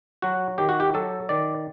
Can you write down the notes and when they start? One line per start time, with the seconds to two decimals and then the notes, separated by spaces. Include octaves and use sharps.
0.22 F#3 F#4
0.58 D#3 G4
0.69 F#4
0.80 G4
0.94 F#3 A4
1.29 D#3 D5